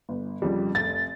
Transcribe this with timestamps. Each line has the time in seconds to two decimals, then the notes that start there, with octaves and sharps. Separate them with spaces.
0.09 G1
0.42 F2 C#3 G3
0.75 F1 A6